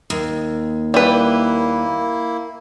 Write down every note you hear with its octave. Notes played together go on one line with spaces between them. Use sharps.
D#2
G3 A#3 E4 B4